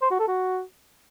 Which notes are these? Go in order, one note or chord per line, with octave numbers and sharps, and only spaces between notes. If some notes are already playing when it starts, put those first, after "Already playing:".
C5
F#4
A4
F#4